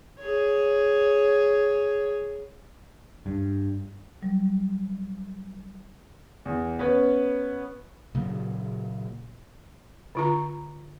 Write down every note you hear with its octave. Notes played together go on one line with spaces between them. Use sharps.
G#4 C#5
G2
F#3 G3
E2
B3 C#4 B4
A#2 C#3 F#3
D3 F4 A#5